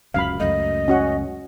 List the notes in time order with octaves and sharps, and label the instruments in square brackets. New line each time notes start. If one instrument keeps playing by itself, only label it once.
[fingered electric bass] D1 C#2 F#2 [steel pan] F5 B5
[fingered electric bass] C#2 F#2 A3 [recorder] D#5
[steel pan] C#4 F#4 F#5